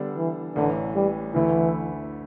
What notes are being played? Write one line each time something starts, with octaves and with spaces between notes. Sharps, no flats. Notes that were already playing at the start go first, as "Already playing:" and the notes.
Already playing: D3 G3 B3 D4 A4
E3
A1 A2 D3 E3
G3
D2 D3 E3 A3 E4